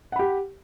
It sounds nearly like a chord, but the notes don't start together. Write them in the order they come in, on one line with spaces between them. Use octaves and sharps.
F#5 B5 G4